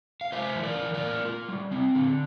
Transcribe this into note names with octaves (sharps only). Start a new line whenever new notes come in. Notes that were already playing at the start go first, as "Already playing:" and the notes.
F5
F4 C5 E5
E3
A#4 D5
E3
A#4 D5
A#3
F4
G3
C4
D3